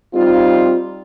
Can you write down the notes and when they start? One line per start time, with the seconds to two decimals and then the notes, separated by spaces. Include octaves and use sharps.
0.14 G3 C4 D#4 F4